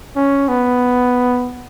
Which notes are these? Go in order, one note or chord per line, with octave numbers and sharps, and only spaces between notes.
C#4
B3